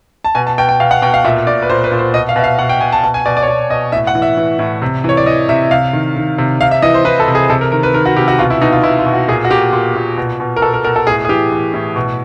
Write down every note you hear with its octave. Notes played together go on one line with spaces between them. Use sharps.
A5
B2 G#5
A5
B2 G5
G5
B2 F5
F#5
B2 G5
F5
A#2 E5
A#2 D5
B4
A#2 C5
B4
A#2
C5
B2 D#5
F5
B2 E5
F5
B2 F#5
G5
B2 G#5
A5
B2 A5
G#5
B2 D5
D5
C#5
B2 D5
B2 D#5
A2 E5
F#5
E3
E5
E3
A2
C3
E3 C#5
D5
E3 D#5
C3 E5
C3 F5
D#3
D#3
C3
C3 F5
E5
E3 D#5
C5
E3 B4
A4
C3
G#4
C3 A4
A#4
D#3 A#4
B4
D#3 A#4
F#4
C3 G4
F#4
B2 F4
E4
B2 D#4
F4
B2 E4
F4
B2
F#4
A#2 G#4
F#4
A#2 G4
A#2
A#2
B2
B2
A#4
B2 A4
A#4
B2 A#4
A4
A2 G#4
G#4
E3 G4
E3
A2
B2